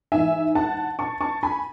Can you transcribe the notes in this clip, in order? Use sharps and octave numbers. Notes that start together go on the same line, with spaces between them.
G#2 E3 E5 G#5
F#5 A5
A5 C#6
A5 C#6
G#5 B5